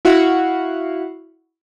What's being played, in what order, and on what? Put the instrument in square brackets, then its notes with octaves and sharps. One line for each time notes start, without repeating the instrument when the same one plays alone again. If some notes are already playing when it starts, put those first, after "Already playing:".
[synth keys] E4 F#4 F5 F#5